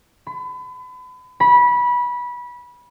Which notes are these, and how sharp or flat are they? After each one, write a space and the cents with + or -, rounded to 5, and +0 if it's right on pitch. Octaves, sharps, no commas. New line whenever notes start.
B5 +35
B5 -20